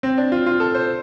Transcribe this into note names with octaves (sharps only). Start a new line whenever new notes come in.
C4
D4
F4
F4
A4
C5